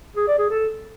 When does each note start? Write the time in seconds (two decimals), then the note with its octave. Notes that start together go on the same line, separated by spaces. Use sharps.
0.16 G#4
0.27 D5
0.39 G#4
0.50 A4